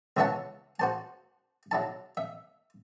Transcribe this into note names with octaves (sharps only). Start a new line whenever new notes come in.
C#2 E3 C#5 E5 F#5 A5
F#4 C5 A5
F#3 E4 A5
E5